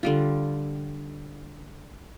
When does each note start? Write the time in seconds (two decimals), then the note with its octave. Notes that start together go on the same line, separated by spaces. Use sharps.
0.03 D3 G3 F4